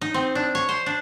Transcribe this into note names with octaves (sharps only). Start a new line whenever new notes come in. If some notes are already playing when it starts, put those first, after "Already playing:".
D#4
C4
D4
C#5
C5
D4